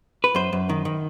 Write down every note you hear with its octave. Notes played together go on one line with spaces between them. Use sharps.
B4
F#2 C5
F#2
D#3
D#3